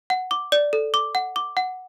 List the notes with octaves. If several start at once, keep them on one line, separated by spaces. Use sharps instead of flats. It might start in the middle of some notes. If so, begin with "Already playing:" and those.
F#5
D6
D5
A4
D6
F#5
D6
F#5